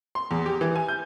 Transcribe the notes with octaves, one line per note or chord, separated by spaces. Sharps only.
C6
E2
G4
E3
G#5
G6